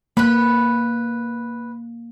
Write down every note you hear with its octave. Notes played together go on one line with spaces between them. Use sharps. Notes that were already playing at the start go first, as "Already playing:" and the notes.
A#3 B4 B5